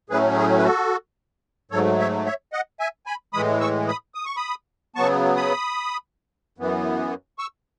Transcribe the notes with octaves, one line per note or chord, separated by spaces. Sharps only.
A2 F#3 A3 C#4 G#4 B4
G#4
B4
F#4 A4
G#2 F#3 A3 A4 C#5
C#5 E5
C#5 E5
D#5 F#5
E5 G#5
G#5 B5
A2 E3 G#3 B5 D#6
C#6 E6
B5 D#6
D#6
C#6
B5 D#6
C#3 F#3 B3 A5 C#6
B5 D#6
F#2 E3 B3
C#6 E6